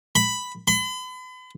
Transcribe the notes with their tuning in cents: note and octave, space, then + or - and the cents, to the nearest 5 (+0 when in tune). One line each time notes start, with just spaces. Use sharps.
B5 +5
B5 +40